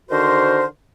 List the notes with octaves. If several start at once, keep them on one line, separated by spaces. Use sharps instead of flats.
D3 D#3 F#4 A#4 C5